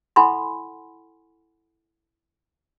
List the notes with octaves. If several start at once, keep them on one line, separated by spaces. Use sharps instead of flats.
E4 A4 F#5 G#5 B5 C6